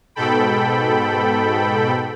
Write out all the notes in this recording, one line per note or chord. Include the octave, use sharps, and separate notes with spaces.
G#2 B2 A4 G5 B5